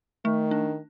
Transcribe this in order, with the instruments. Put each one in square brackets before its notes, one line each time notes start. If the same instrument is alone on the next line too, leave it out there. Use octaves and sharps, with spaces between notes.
[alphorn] D#3 [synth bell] A3
[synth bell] D4